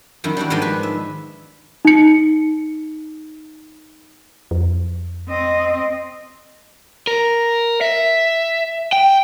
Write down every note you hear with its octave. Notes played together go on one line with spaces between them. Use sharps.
F#2 D#3 E4
G3 D4 E4 F#4
G#2 D#3 F3 G#3 D4
B4 G#5
E5
D#4 C#7
F2
C4 D#5
A#4
E5
G5